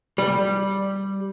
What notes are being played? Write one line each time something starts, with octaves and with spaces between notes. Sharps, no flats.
G3